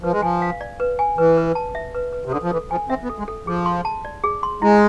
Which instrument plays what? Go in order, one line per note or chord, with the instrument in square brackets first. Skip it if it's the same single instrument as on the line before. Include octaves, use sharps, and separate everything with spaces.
[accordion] F3 [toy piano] B4
[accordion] G#3
[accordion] F3 [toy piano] G#5
[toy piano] F5
D5
B4
G#5
[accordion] E3 [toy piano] B4
[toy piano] B4
A5
E5
B4
B4
[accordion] C3
[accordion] D3 [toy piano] A4
[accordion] F3
[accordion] E3 [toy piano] A4
[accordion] F3 [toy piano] G#5
[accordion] C4 [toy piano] E5
[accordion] B3
[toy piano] A4
[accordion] G#3
[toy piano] A4
[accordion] F3 [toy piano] G#4
[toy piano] C6
A5
D5
G#4
C6
[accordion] G#3 [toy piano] E4